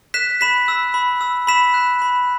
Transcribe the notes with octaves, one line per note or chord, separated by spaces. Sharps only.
F#6 B6 E7
B5 B6 E7
E6
B5
E6
B5 B6 E7
F#6
B5